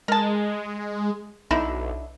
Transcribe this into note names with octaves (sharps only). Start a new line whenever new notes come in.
G#3 A#4 A5
B1 D3 D#4 E4